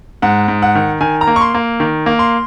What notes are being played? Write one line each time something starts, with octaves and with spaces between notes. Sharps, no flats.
G#2 F#5
G#2
F#5
D#3
D#3 G#5
A#5
A#3
C#6
C6
A#3
D#3
A#3
C6